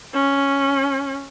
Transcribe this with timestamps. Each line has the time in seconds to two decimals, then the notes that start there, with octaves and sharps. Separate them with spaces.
0.14 C#4